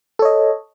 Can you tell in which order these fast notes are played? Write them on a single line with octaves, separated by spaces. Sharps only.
A4 C#5 D#5